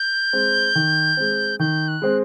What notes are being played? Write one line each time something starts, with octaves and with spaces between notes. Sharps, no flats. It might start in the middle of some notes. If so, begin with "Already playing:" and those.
Already playing: G6
G#3 C4
D#3
G#3 C4
D#3 G6
F#6
G#3 C4